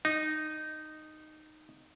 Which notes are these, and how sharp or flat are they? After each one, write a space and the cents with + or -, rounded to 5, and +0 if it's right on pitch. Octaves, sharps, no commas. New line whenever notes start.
D#4 -10